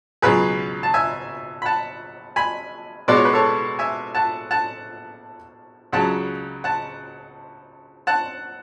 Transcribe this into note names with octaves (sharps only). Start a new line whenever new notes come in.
C#2 B2 F#3 G#4 B4
A5
E5 G#5
B5
F#5 A5
G#5 B5
B2 G#3 B3 D5
C#5
B4
A4 C#5
E5 G#5
F#5 A5
F#5 A5
C#2 C#3 F#3 F#5 A5
F#5 A5
F#5 A5